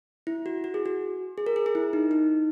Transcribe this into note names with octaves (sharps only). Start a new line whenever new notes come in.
E4
F#4
F#4
G#4
F#4
G#4
A#4
G#4
G#4
E4
D#4
D#4